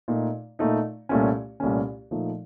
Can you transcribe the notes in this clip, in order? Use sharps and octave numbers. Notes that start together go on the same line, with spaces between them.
A#2 A3 D#4
A#2 A3 D#4
C2 A#2 A3 C#4
C2 A#2 A3 C#4
A#2 F3 A3 D#4